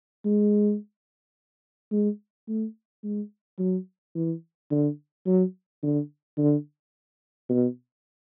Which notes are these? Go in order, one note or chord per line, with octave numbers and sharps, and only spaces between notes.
G#3
G#3
A3
G#3
F#3
E3
D3
F#3
D3
D3
B2